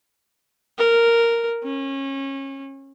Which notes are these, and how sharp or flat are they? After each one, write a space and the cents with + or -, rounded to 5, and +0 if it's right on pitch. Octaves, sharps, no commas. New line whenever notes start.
A#4 -5
C#4 -25